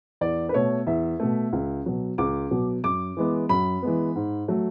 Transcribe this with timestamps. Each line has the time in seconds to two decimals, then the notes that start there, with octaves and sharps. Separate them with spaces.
0.21 E2 D5
0.49 B4
0.54 B2 A3 C#5
0.87 E2 E5
1.20 B2 A3
1.53 C#2
1.86 B2 F#3
2.18 C#2 D6
2.51 B2 F#3
2.84 F#2 D6
3.17 E3 G#3 B3
3.49 F#2 B5
3.82 E3 G#3 B3
4.15 G#2
4.48 F#3 A3